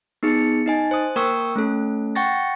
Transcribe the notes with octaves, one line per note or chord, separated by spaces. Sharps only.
B3 D#4 G#4 C#7
D#4 D#5 G#5
C5 D#6
A#3 A#4 G5 C#6 D#6 E6
A3 C#4 A4
F#5 G5 C#6 A6 A#6